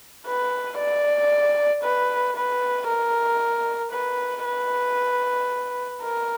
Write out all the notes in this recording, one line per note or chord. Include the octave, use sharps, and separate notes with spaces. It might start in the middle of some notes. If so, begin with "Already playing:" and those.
B4
D5
B4
B4
A#4
B4
B4
A#4